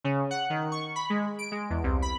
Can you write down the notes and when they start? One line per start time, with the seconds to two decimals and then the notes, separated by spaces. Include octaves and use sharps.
0.04 C#3
0.31 F#5
0.50 D#3
0.72 C#6
0.96 B5
1.10 G#3
1.39 D7
1.52 G#3
1.70 E2
1.84 C2
2.02 B5